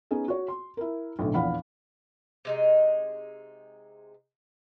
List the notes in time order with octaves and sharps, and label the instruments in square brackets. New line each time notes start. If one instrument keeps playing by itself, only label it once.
[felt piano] B3 C#4 D#4 G#4
F#4 C#5
C6
E4 A#4
B1 A2 D3
A#1 E2 F5 F#5 B5
[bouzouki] C3 G#3 D#4